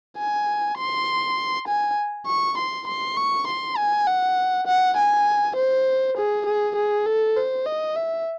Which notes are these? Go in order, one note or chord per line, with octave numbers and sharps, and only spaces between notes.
G#5
C6
G#5
C#6
C6
C6
C#6
C6
G#5
F#5
F#5
G#5
C5
G#4
G#4
G#4
A4
C5
D#5
E5